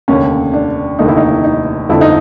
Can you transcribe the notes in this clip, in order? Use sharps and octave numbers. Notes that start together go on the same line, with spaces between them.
F1 D#2 D3 C#4
D4
F1 D#2 D3 D#4
E4
D#4
D#4
G1 F2 D3 E4
D#4